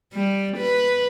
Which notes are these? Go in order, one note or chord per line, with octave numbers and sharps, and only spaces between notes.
G3
B4